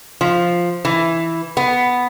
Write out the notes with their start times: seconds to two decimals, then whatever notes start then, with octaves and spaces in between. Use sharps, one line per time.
0.21 F3
0.85 E3
1.57 B3